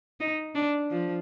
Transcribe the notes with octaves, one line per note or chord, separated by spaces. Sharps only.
D#4
D4
F3